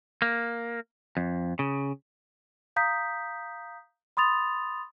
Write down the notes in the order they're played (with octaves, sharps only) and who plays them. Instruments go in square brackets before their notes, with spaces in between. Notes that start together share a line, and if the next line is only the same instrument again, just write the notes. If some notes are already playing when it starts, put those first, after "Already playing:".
[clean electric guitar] A#3
F2
C#3
[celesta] F5 A#5 D#6 G6 B6
B5 C6 D#6 A6 F7